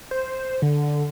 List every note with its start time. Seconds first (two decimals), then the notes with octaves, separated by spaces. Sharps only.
0.11 C5
0.62 D3